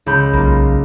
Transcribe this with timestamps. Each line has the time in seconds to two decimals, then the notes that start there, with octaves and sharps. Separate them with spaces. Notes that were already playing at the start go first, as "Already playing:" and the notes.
0.06 C#2 B5 G6
0.33 B1 A#3 F4